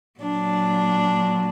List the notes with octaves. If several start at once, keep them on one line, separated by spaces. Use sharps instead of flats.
A#2 F#3 D4